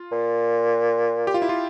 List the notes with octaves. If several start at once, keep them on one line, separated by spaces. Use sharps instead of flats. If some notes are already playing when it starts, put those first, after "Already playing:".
Already playing: F4
A#2
G4
F4
E4
F4